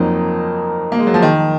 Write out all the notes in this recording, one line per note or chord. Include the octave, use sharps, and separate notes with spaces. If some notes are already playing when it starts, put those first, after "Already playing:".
Already playing: F2 F3 F#3 A#3 D#4
A#3
G#3
F#3
F3
D#3